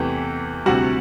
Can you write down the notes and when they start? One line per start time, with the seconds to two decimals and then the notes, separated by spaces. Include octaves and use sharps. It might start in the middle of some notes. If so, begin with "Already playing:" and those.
Already playing: E2 C3 E3 A3 G4
0.66 D2 C3 G3 F#4 F#5